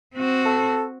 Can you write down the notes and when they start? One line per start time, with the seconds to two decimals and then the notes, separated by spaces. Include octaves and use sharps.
0.15 C4 F#4
0.45 A4